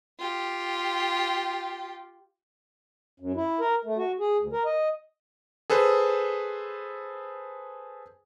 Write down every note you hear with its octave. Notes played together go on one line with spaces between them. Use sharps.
F4 G4
F#2
E4
A#4
A3
F#4
G#4
D2
A#4
D#5
G#4 A4 B4 C5